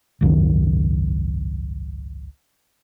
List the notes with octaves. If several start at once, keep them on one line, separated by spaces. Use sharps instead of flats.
G#1 C#2 F#2 D#3